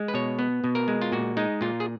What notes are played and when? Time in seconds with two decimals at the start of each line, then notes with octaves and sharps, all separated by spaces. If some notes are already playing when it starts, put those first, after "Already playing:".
Already playing: G#3
0.08 B4
0.14 B2 C#5
0.39 B3
0.64 B2
0.75 A#4
0.88 G#3
1.02 F4
1.12 A#2 F#4
1.37 G#3 D#4
1.61 A#2 F4
1.80 G#4